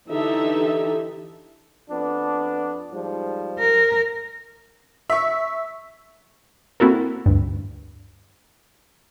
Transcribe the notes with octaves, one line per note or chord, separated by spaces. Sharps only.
D3 E3 D#4 G4 A4 E5
F2 B3 D4
G#2 F3 G3
A#4
E5 C#6
A#3 C4 E4 F#4 A4 A#4
D2 G2